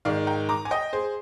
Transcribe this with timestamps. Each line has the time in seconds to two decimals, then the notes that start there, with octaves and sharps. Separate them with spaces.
0.05 G#2 D#3 D5 F5
0.27 G5 A#5
0.49 A#5 D6
0.65 G#5
0.71 D#5 G5
0.93 G#4 C5